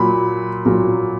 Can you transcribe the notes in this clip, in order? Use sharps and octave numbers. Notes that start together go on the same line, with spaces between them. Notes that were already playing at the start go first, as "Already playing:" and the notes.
Already playing: A#2 F#3 B5
A#2 F#3